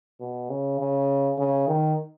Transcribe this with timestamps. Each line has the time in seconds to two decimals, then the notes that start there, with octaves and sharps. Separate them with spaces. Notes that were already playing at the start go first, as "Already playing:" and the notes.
0.21 B2
0.50 C#3
0.80 C#3
1.38 C#3
1.68 D#3